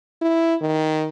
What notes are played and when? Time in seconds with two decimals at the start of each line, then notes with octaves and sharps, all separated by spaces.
0.21 E4
0.61 D#3